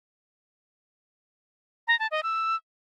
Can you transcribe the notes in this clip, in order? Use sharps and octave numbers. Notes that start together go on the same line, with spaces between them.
A#5
A5
D#5
E6